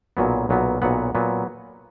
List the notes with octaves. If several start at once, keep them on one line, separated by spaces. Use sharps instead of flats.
B1 A#2 F#3 B3
B1 A#2 F#3 B3
B1 A#2 F#3 B3 F#5
A#2 F#3 B3